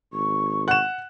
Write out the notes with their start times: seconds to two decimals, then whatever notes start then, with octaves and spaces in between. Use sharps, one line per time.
0.13 G#1 C#6
0.68 F#5 F#6 E7